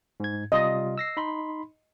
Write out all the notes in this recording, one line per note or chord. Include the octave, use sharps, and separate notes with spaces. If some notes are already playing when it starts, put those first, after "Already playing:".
G#2 G#6
C3 G3 F4 D#5
E6 A#6 C7
D#4 B5 C6